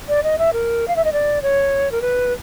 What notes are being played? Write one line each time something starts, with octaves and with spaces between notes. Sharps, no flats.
D5
D#5
E5
A#4
F5
E5
D#5
D5
C#5
A#4
B4